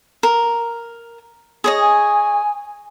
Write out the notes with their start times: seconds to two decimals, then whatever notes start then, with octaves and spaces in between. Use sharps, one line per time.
0.23 A#4
1.64 G#4 C#5 D#5
1.79 G#5